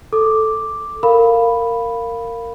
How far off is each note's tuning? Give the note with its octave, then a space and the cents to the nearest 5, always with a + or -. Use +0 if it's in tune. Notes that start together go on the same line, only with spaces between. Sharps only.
A4 +0 D6 +0
A#4 -20 F5 +0 B5 +0